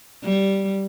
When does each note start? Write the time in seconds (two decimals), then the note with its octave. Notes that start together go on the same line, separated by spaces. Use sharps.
0.23 G3